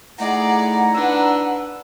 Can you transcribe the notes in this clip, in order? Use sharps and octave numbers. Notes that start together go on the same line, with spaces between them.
A3 D#4 E4 G#4 D5 F#5 A#5
D4 B4 E6